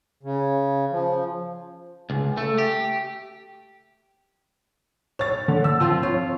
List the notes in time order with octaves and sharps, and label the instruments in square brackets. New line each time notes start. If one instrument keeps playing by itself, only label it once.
[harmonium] C#3
F3
[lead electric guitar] C#2
A3
G4
[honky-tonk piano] C#5 A6
D3
E6
[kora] F3 C4 F4
[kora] F4 [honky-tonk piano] C#5